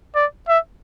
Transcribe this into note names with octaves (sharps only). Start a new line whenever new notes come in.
D5
E5